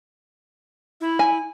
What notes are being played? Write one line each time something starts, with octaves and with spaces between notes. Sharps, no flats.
E4
G#5